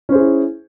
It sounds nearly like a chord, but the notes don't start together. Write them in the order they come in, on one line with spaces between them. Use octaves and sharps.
C#4 C5 G#4 E4